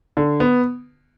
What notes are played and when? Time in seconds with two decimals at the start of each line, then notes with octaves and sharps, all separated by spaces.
0.17 D3
0.40 B3